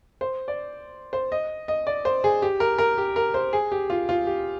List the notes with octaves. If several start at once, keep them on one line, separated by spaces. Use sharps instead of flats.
C5
D5
C5
D#5
D#5
D5
C5
G#4
G4
A#4
A#4
G4
A#4
C5
G#4
G4
F4
F4
G4